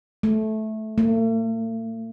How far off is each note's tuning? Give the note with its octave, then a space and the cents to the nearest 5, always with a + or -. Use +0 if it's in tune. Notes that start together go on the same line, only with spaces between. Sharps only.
A3 -15
A3 +45